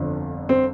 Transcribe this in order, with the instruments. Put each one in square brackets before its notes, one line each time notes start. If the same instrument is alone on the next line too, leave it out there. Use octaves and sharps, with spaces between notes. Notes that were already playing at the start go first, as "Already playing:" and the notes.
Already playing: [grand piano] G1 F2 D3 F3
C4